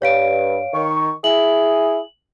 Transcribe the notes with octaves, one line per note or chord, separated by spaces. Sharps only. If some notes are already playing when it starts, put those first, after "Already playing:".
G2 C#5 F5 D7
D#3 C#6
E4 G#4 F#7